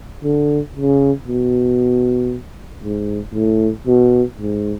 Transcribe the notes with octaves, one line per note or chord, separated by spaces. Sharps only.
D3
C#3
B2
G#2
A2
B2
G#2